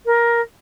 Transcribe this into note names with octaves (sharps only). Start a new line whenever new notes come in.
A#4